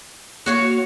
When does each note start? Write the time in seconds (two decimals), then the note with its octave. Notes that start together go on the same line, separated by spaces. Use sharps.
0.46 A#3 F#4 C#5 F5